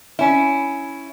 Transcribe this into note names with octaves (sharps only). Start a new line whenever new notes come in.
C#4 E4